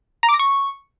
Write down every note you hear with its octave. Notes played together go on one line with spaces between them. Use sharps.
A#5
D6
A#6
C#6